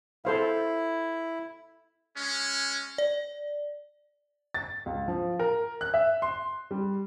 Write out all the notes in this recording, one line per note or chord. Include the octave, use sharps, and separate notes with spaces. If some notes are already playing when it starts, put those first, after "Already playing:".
E4 A4 C5 F5
G#3 C#4
D5
A6
C#2
F3
A#4
F#6
E5
C6
G3